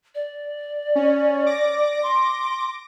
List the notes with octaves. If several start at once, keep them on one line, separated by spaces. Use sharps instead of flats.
D5
C#4
D6 A#6
C6